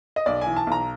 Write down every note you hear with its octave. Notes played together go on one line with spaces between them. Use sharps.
D#5
B1 D5
E3 G#5
A5
B1 A#5